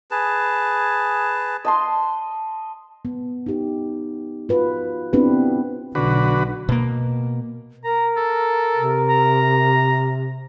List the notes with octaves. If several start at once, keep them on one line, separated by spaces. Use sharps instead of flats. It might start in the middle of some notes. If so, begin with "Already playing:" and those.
G#4 B4 A5
D#5 A5 C6
B3
D#4 G4
F4 F#4 B4
B3 C4 D4 E4 G4 B4
B1 D3 F#4 B4
B2 A#3
A#4 A#5
A4
C3
A#5